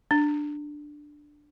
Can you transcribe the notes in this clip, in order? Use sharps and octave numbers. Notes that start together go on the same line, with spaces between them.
D4